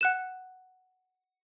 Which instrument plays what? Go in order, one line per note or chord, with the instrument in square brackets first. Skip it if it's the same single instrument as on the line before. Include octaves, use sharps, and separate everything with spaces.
[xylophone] F#5 F#6 E7